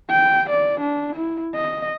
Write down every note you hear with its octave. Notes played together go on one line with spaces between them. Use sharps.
G5
D5
D4
E4
D#5